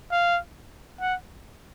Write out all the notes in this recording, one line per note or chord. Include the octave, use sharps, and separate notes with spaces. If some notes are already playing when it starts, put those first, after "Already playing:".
F5
F#5